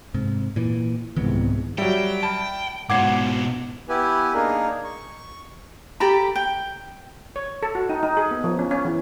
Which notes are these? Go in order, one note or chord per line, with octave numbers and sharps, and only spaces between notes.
G#2 C3
A#2 E3
C2 G#2 D#3 E3 B3
F#3 G3 E5 G5
G3 A5
F2 G#2 B2 C#5 F#5 D6 G#6 C7
B3 E4 G4 B4 G#5
A#3 D4 D#4 G#4 A#4
C#6
G4 A4 A#5 B5
G5
C#5
A4
F#4
D#4
D#4
G#4
B3
F3
C#4
C#4
E3